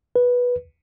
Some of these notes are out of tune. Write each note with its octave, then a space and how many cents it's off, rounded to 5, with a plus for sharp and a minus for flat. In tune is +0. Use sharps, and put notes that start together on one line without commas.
B4 -10